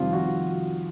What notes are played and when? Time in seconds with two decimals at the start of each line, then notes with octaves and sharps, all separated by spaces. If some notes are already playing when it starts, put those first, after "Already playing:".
Already playing: F2 C3 D#3 G3 F4
0.13 F#4